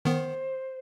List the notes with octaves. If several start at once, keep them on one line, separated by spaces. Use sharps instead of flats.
D#3 B3 C5